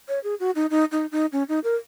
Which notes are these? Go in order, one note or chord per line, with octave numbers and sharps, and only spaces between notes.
C#5
G#4
F#4
D#4
D#4
D#4
D#4
C#4
D#4
A#4